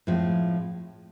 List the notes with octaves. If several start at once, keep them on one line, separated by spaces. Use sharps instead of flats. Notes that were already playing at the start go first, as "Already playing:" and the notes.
A2 F3 G#3 C4